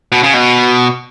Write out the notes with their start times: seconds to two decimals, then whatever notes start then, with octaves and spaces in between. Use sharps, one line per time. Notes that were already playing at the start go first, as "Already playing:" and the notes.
0.12 B2
0.23 C#3
0.34 B2